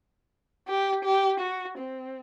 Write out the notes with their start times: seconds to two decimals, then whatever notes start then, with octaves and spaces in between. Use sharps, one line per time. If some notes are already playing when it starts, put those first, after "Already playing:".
0.67 G4
1.04 G4
1.40 F#4
1.77 C4